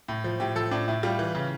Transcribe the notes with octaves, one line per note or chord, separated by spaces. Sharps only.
A2
F3
A2 G4
F3 A4
A2 D4
A2 E4
G3 F4
E3
C#3